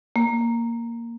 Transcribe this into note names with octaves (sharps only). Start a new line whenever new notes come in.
A#3